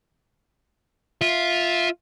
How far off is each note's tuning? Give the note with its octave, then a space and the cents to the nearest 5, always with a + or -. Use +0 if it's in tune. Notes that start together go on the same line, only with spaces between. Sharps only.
F4 +0 E5 -10